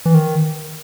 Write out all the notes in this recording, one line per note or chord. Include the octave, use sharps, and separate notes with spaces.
E3
D#3